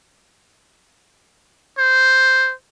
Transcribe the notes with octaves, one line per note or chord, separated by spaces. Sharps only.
C5